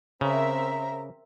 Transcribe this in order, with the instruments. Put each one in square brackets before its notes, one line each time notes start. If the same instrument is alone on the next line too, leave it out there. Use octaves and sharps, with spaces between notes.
[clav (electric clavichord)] C#3 [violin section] C4 A#4 E5 [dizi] A#5